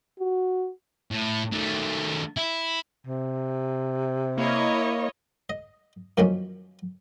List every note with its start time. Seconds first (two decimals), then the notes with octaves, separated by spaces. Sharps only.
0.20 F#4
1.11 A2
1.53 D#3 A3
2.37 E4
3.07 C3
4.38 A#3 E4 C#5 D#5
5.50 D#5
6.17 F#2 D#3 F3 G3 A#3 C#4